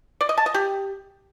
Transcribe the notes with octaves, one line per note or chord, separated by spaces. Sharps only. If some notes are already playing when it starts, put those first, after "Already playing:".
D5
D#5
A5
D#5
G4